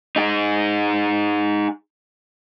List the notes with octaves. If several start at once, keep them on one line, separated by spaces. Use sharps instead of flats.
D#4 G#4